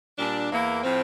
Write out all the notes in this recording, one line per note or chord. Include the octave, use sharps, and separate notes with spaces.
A#2 G3 D4
E2 E3 A#3 E4
A2 F3 C4